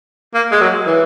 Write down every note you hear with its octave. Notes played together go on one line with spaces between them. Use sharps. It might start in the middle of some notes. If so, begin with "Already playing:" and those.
A#3
G#3
F#3
E3